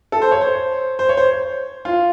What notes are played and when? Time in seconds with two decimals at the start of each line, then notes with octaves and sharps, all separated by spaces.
0.12 A4
0.22 C5
0.31 C#5
0.41 C5
0.99 C5
1.09 C#5
1.17 C5
1.85 F4